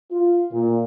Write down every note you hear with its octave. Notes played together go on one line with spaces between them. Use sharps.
F4
A#2